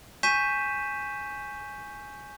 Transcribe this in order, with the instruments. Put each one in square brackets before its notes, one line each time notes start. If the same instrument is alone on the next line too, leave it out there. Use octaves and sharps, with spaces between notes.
[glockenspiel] G#5 C#6 G6 B6 D#7 E7